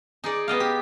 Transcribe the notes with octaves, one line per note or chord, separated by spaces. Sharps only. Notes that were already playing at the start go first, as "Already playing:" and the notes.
D#4 G#4 D5
B3 D#5 F5
G4